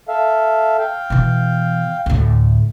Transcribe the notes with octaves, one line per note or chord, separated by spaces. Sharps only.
A4 E5 F5
F5 G5
B2 E3
D2 A2